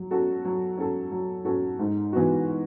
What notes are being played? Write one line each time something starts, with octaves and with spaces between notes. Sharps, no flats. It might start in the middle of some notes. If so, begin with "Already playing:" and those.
Already playing: F#3
C#4 F#4 A4
F#3
C#4 F#4 A4
F#3
C#4 F#4 A4
G#2
E3 B3 F#4